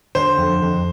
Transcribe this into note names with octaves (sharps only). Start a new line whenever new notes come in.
D3 C5
F2
F2